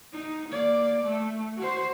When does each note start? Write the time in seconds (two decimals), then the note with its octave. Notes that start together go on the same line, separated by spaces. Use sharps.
0.13 D#4
0.50 A#3 D5
1.05 A3
1.57 F#4 C5